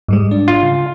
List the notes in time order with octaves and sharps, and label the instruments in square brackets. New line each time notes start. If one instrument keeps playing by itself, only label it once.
[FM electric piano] G#2 G3 G#3
D4
[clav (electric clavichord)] F4
[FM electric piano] C#3